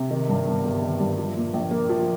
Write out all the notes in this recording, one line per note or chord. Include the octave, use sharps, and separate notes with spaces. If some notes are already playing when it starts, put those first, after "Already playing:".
Already playing: C3
D#3
G2
G1
G1
D#3
G2
F3
A#2
A#1
A#3
F3